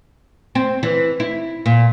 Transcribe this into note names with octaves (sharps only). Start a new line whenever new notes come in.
C4
E3
E4
A#2